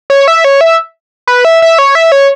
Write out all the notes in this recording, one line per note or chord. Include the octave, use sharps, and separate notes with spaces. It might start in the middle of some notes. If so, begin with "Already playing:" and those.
C#5
E5
C#5
E5
B4
E5
E5
C#5
E5
C#5